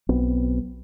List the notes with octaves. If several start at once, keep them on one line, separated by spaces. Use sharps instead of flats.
B1 F#3 B3 C4